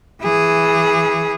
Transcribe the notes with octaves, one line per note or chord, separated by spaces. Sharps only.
E3 G#4